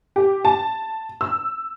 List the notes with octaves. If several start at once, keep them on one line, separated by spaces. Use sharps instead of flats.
G4
A5
E6